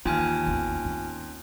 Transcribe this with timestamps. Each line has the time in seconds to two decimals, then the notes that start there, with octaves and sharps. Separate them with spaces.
0.05 D#2 E3 F4 G#5 F6
0.46 A1 E2
0.85 C4 C#4